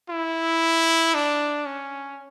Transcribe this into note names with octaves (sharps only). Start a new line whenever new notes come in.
E4
D4
C#4